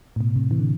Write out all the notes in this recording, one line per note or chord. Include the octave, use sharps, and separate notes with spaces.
A2
B2
A2 C3
C3 E3
D3